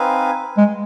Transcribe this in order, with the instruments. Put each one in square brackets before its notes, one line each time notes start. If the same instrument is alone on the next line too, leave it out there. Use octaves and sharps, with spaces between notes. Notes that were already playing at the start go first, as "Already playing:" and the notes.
Already playing: [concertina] C4 D#4 B4 F5 G#5
[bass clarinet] G#3